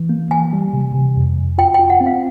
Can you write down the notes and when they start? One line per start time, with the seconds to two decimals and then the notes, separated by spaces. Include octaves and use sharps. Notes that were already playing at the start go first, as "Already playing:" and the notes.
Already playing: E3
0.09 A#3
0.31 E3 G#5
0.53 G3
0.73 C3
0.94 C3
1.16 F2
1.37 F2
1.58 F4 G5
1.74 G5
1.79 F4
1.90 F#5
2.01 C4
2.06 F5